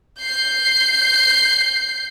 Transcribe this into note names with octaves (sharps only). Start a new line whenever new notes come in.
G6 C7